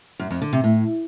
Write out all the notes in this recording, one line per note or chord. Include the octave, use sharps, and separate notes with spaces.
F#2
F2
D3
C3
A2